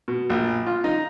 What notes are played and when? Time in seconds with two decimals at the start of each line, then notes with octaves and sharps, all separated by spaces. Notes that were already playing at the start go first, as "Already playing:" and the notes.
0.08 B2
0.30 A#1
0.66 F4
0.84 D#4